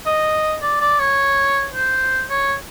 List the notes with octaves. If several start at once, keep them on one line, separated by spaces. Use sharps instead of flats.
D#5
D5
D5
C#5
C5
C#5